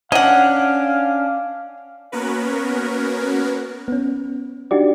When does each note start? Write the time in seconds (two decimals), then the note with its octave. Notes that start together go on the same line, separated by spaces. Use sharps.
0.12 C#4 D4 D#5 F5 F#5
2.12 A#3 B3 C#4 F#4 A#4 B4
3.88 B3 C#4
4.71 D4 D#4 F#4 G4 D5